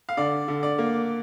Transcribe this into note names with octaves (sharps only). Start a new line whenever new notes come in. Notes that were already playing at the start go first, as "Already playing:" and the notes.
F5
D3 D5
D3
D5
A#3